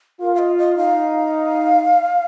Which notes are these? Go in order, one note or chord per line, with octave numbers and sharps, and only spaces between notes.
F4 A#4
F5
D#5
D#5
D#4 F5